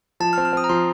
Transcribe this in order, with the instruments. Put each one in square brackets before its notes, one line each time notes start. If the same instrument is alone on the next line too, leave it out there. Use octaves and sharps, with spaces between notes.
[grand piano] F3 [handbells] A5
[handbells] F6
[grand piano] C4
[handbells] F6
[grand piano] C4 [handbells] D#6
[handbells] A#5
[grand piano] F3 [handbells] C6